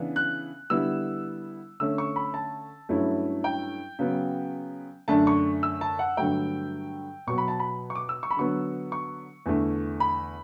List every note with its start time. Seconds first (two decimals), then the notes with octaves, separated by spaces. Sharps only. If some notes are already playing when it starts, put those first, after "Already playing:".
Already playing: C#3 E3 B3 D4
0.16 F#6
0.70 D3 G3 B3 E4 E6
1.80 D3 A3 C#4 E6
1.98 C#6
2.16 B5
2.34 A5
2.89 G2 F#3 A3 C#4 E4
3.44 G5
3.99 C#3 F#3 B3
5.08 F#2 D3 A3 D4 A5
5.27 C#6
5.63 E6
5.81 A5
5.99 F#5
6.17 G2 D3 F#3 A3 G5
7.27 B2 F#3 B3 C#6
7.38 B5
7.48 A5
7.60 B5
7.90 C#6
7.95 D6
8.09 E6
8.23 C#6
8.31 B5
8.37 D3 F#3 B3 C#6
8.92 C#6
9.46 E2 D3 A3
10.00 B5